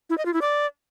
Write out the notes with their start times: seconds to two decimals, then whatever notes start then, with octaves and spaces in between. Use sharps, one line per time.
0.10 E4
0.18 D#5
0.26 F4
0.34 E4
0.42 D5